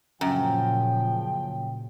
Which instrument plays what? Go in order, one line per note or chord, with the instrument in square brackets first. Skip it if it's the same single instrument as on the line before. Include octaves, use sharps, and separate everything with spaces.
[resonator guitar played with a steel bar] F#2 [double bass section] A#2 C#3 [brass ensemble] F3 G5